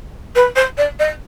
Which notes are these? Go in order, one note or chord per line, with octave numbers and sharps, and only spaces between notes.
B4
C5
D5
D#5